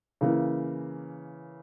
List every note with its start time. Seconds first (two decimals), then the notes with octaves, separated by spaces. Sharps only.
0.21 C#3 E3 A#3